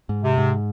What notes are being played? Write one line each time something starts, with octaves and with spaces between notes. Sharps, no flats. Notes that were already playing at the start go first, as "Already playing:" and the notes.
G#2
C3
G#2